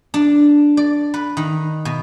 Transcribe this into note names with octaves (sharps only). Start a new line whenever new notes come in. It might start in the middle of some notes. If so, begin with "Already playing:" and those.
D4
D5
B4
D#3
B2